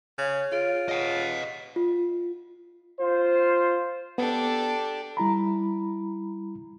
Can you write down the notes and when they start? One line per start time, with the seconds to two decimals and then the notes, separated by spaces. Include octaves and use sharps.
0.18 C#3 C#5 F5
0.52 F4 G#4 C#5 D7
0.89 D#5 F#5
1.76 F4
2.99 F4 C5
4.18 B3 D4 G4 A4
5.17 G3 E4 A#5 B5